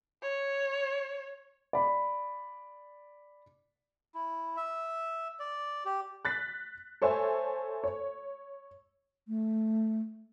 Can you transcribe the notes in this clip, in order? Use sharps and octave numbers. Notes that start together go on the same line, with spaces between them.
C#5
D5 B5
E4
E5
D5
G4
F#6 A6 B6
A4 C5 C#5 E5 G#5
C#5
A3